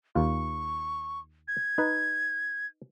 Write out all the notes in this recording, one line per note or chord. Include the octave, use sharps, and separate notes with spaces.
D#2 F4 C#6
G#6
D#4 B4